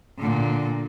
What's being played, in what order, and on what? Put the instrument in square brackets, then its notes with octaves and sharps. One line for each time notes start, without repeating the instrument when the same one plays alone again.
[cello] A#2 D3